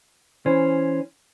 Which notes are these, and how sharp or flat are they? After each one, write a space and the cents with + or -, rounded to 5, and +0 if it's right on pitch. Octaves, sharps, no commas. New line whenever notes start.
E3 +0 C#4 +0 C5 +0